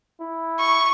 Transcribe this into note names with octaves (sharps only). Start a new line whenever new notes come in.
E4
C#6